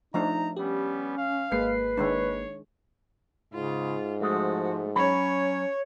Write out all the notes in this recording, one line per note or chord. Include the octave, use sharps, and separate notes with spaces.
F3 A3 D4 D#4 D#5 A#5
G3 B3 C#4 G4
F5
G#1 G#3 A#3 B4 C7
D#3 G#3 D4 C#5
G#2 C#3 F4
F3 G#3 A3 F#4
F#3 C#4 C#5 B5